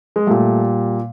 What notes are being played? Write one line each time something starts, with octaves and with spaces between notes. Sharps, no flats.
G#3
A#2 G3 A3